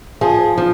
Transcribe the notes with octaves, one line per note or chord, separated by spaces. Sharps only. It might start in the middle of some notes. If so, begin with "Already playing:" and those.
F3 G#4
F3